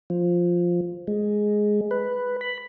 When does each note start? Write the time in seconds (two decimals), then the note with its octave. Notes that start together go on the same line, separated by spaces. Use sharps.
0.10 F3
1.07 G#3
1.91 B4
2.41 B5